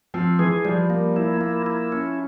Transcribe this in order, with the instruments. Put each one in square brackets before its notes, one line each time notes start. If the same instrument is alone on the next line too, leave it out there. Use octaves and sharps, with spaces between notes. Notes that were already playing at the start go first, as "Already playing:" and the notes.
[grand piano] F3 [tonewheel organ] C4
[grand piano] E3 [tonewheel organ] G#4
[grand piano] F3 [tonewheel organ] G3
[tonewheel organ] A#3
E4
A#3
E4
C#4